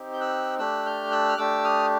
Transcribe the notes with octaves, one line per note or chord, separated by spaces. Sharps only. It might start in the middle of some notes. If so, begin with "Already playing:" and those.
Already playing: C4 D#4 G4
G6
E6 F#6
A3 D4 G4 E6 F#6
F6 G6
E6 F#6
F6
A3 D4 G4 D6 E6
D#6 F6